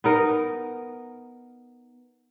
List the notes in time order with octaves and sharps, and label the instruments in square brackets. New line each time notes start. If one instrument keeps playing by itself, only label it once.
[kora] B3 D#4 A#4